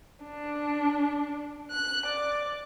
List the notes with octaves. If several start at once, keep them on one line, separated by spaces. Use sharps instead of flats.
D4
F#6
D5